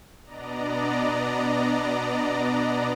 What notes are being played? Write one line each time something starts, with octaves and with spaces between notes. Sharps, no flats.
B2 B3 D4 D5 D#5 A#5